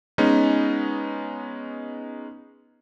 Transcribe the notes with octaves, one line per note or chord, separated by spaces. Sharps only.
G#3 B3 C#4 D#4